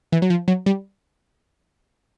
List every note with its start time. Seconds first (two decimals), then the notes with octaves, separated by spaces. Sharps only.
0.12 E3
0.22 F#3
0.30 F3
0.48 F#3
0.66 G3